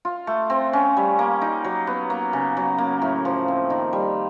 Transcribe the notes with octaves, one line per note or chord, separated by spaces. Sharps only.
F4
A3
C4
C#4
G3
A#3
D#4
F#3
B3
A#3
C#3
F#3
A#3
A2
F3
C4
D#3
G3